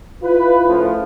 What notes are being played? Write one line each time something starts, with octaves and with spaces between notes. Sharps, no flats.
E4 F4 B4
A2 C#3 F3